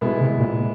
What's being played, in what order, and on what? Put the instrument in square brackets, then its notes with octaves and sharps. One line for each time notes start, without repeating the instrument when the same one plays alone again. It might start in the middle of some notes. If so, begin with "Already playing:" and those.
[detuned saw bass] B2 [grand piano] G#3 B3 E4
[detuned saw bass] C3
A#2